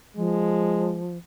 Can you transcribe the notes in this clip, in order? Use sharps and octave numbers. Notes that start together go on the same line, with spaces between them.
F3 G#3